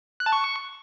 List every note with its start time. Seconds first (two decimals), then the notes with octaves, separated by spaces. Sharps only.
0.20 F#6
0.26 A5
0.32 C#6